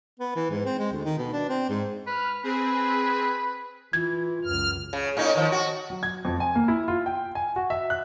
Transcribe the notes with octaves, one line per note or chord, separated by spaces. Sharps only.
B3
E3
G#2
C4
G#3
D2
D#3
B2
D4
C4
G#2
B4 F6
C4 G#4 B4
E3 F4 G#6
C#2 F#2 F6
C#3
A2 C#4 D#4
D#3 F3
F#4
F#3
G#6
F2
G#5
A#3
E4
F4
G5
G#5
F#4
E5
F#6